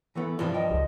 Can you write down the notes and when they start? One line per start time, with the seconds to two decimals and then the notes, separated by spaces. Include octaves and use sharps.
0.15 E3 A3 B3
0.39 G2 C3 E3 F3 F4
0.54 D#5 G5
0.71 C#2